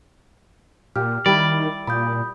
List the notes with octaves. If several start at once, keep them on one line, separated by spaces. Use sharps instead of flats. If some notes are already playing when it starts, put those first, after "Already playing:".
A#2 G4 F6
D#3 G3 E4 D5
A#2 B5 D#6 G6